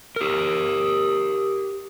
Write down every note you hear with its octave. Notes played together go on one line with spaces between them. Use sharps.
G4 A#4